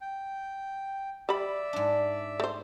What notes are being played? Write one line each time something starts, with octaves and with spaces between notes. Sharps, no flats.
G5
G3 D5 E5 B5
G#2 D4
A3 C5